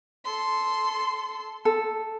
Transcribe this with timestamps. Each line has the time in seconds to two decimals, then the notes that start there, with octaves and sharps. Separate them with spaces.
0.25 A4 C6
1.65 A4